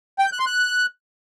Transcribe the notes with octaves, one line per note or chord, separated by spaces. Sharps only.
G5
G6
F#6
C6
F#6